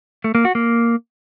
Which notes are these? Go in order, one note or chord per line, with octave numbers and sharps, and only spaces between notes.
A3
A#3
F#4
A#3